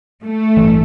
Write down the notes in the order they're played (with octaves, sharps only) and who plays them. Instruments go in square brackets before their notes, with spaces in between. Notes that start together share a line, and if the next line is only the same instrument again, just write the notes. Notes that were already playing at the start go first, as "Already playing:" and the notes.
[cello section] A3
[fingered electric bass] A1 G2 E3